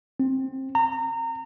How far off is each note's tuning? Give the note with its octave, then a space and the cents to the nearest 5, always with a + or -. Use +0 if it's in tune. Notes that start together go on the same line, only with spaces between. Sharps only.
C4 +15
A#5 -25